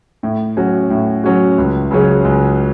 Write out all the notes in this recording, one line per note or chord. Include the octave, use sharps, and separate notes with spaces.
A2
F#3 C#4 F#4
A2
F#3 C#4 F#4
C#2
C#3 F#3 C#4 G#4
C#2